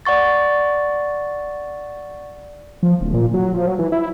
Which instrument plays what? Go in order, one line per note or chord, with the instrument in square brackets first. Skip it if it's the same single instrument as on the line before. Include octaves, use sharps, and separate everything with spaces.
[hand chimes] D5 F#5 C#6 A6
[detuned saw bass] F3
D1
A#2
F#3
F3
F#3
E3
E4